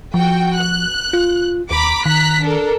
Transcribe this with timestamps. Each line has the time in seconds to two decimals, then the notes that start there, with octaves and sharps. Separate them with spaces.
0.14 F3 F#4 G5
0.57 F#6
1.13 F4
1.71 D#2 A#5 B5 D6
2.05 D#3 A#5 F#6 B6
2.42 D4 A4 A#4